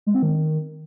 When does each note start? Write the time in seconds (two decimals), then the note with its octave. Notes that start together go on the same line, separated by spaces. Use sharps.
0.06 G#3
0.14 C4
0.22 D#3